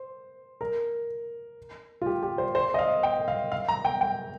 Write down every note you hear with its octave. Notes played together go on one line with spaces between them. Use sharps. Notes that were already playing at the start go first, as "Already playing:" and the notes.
Already playing: C5
A#4
F4
G4
G4
C5
C5
D#5
F5
G5
F5
F5
A#5
G5
G5